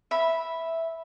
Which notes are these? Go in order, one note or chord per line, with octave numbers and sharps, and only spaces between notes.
E5 B5